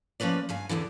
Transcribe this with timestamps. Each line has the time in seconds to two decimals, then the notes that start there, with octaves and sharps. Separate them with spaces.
0.20 F3 A#3 C#4 B4 D5
0.49 G2 F5 G#5
0.69 E2 G2 D3 E3